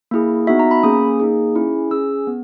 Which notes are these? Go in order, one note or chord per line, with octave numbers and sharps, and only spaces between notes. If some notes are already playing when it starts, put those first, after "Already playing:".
A#3 E4 G#4
B3 D#4 F#4 E5
A#5
B5
A#3 C#4 G#4 D#6
A#3 D#4 G#4
C#4 E4 G#4
C#4 G#4 E6
B3